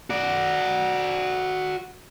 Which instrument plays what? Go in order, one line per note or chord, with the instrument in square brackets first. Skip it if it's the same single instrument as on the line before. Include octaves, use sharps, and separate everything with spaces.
[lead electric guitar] F#4 D5